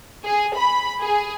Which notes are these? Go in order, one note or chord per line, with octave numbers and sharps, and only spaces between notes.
G#4
B5
G#4